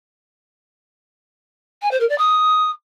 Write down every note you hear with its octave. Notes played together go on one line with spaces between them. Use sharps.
G#5
C5
A#4
D5
D#6